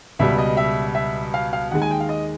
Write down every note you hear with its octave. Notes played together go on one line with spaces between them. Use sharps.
C#2 B2 G3 E5
D#5
E5
E5
F5
F5
D#2 D#3 G#3 F#5
G#5
G5
F5
D#5